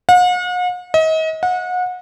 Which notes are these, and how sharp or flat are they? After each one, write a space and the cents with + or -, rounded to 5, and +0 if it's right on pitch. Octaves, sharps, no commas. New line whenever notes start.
F#5 -45
D#5 +35
F#5 -30